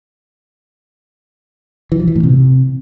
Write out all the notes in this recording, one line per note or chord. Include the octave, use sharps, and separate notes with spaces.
E3
F3
E3
A2
C3